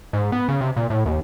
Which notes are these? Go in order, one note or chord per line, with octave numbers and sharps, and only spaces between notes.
G#2
B3
C#3
C3
A#2
A2
D#2